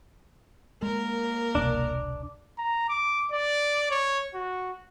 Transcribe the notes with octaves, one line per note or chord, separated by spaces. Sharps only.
G#3 A#3 A#4
E1 C2 D4
A#5
D6
D5
C#5
F#4